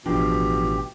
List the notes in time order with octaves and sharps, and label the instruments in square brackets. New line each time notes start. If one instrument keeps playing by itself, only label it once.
[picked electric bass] A1 D4 [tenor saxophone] B2 [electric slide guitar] F3 [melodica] G4